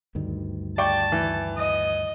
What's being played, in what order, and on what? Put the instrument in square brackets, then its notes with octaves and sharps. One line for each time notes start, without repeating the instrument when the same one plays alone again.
[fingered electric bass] D2 G2 D#3
[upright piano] D5 G5 C#6 [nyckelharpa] A5
[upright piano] E3
[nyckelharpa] D#5